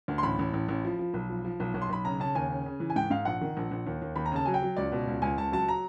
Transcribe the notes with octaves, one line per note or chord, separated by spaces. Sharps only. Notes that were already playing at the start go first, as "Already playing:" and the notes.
D2
C6
A1 B5
A1
A1
A1
F3
F3
B1
F3
F3
B1
B1
C6
B1 B5
C#3 A#5
C#3 A5
D#2 G#5
C#3
C#3
E3
G#5
G#2 G5
G#2 F5
A#1 F#5
D#3
A#1
A#1
D#2
D#2
D#2 B5
A#5
C#3 A5
F#3 G#5
G5
F#3
C#2 D5
B2
C#2
C#2 G#5
C#2 A5
F#3 A5
A#5